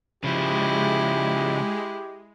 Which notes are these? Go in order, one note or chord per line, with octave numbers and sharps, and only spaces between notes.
C#3 F3 G#3 E4 G4